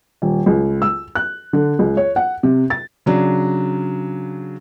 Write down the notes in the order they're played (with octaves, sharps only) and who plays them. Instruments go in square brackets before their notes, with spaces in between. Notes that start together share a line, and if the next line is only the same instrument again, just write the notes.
[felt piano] D#1
C#2
E6
F#6
D3
C#2
C#5
F#5
C3
A6
C#3 F#3 D4